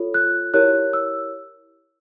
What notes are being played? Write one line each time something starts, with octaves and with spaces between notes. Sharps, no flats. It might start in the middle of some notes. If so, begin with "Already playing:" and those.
Already playing: F4 A4 C#5
F#6
E4 G4 A#4 C#5 F#6
E6